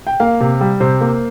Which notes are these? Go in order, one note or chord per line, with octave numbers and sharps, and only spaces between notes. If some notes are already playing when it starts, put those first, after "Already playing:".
G5
A#3 F5
C3
G3
C3 C5
A#3